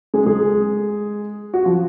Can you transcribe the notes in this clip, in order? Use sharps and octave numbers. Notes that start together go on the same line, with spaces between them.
G#3 G#4
G#3 G#4
F#4
F3 F4